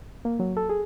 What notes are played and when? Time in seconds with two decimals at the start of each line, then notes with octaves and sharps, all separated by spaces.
0.25 A#3
0.39 F#3
0.57 A4
0.69 G#4